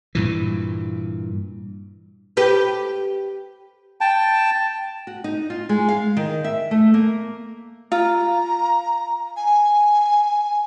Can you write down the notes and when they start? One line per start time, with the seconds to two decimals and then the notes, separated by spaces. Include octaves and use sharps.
0.15 G2 A#2 E3
2.37 G4 B4
4.01 G5 A5
5.07 F#4
5.24 D#4
5.50 F4
5.69 G#3
5.88 F5
6.17 D#3
6.44 E5
6.71 A3
6.94 A#3
7.92 F4 A#5
9.37 G#5